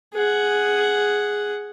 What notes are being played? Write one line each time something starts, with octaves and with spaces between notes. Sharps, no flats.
G#4 F#5